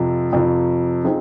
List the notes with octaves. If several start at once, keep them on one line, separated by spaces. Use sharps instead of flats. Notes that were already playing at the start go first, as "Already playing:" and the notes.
Already playing: F2 C3 F3
F2 C3 F3
F3 C4 D#4 G#4